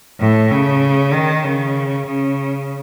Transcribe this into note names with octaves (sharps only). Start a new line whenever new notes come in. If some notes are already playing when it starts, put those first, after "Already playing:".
A2
C#3
D#3
C#3
C#3